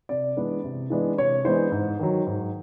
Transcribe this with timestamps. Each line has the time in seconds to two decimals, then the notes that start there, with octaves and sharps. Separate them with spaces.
0.09 C3 D5
0.36 E3 G#3 B3 D4
0.64 C3
0.90 E3 G#3 B3 D4
1.18 C3 C#5
1.45 E3 G#3 B3 D4 C5
1.71 G#2
1.99 D#3 F#3
2.26 G#2